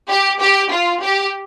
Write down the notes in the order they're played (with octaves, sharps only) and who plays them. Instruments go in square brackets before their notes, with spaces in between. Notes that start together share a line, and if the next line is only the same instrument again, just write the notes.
[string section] G4
G4
F4
G4